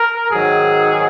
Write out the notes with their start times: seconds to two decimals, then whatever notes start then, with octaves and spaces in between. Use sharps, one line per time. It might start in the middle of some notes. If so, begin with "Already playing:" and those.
Already playing: A#4
0.30 G#2 D#3 F#3 G#4